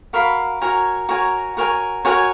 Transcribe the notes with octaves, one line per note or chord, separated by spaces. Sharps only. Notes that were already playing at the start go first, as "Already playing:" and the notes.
F#4 A#4 F5 B5
F#4 A#4 C#5 G#5
F#4 A#4 C#5 G#5
F#4 A#4 C#5 G#5
F#4 A#4 C#5 G#5